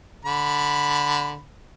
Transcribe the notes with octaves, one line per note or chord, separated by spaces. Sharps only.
D3 B5